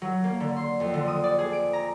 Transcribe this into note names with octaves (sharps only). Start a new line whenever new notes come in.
F#3
A#3
D3
C6
F2
D3
D#6
D5
G#4
D7
A#5